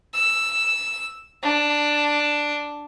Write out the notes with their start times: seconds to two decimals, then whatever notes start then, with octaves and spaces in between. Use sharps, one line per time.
0.13 E6
1.42 D4